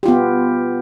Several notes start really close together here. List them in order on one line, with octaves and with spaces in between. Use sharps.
G4 F4 B3